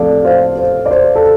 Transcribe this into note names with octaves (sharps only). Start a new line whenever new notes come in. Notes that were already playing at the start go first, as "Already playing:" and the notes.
Already playing: A2 F3 C4 A4 D5 F5
C5 F5
C5
D5
C5
A4